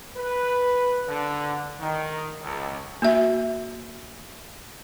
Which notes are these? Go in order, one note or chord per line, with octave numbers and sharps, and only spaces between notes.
B4
D3
D#3
C#2
A#3 F#4 E5